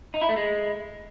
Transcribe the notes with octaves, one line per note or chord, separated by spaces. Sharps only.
D#4
E4
A3
G#3